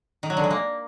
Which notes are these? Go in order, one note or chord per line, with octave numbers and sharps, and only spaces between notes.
D#3
F#3
D3
G#3
A#3